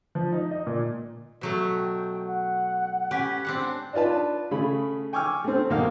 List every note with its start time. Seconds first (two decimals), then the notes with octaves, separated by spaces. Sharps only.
0.15 F3
0.33 D#4
0.51 D#5
0.67 A#2
1.41 B2 F#3 A3
1.77 G5
2.27 F#5
3.11 C#4 G4 B4
3.45 C4 D4 F#5
3.93 D4 D#4 F4 B4 A5
4.51 C#3 A3 G#4 B5
5.13 G5 G#5 C#6 D6 E6 F6
5.44 A3 C4
5.70 B1 A#3 D#4 F5